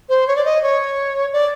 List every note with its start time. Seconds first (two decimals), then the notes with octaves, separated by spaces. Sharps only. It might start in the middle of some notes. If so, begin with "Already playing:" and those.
0.09 C5
0.27 C#5
0.36 D5
0.45 D#5
0.63 C#5
1.33 D5